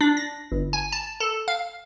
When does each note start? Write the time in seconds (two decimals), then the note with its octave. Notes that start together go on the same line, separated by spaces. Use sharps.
0.01 D4
0.17 A#6
0.52 G1
0.73 G#5
0.92 A5
1.20 A4
1.48 F5